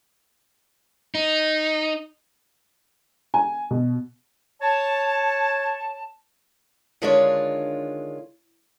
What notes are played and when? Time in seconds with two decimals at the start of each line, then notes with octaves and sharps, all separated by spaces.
1.15 D#4
3.34 G#5
3.71 B2
4.61 C#5 A5
7.02 D3 D#3 G#3 D4 F4 C#5